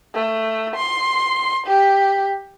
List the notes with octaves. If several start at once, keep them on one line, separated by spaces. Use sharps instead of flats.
A3
C6
G4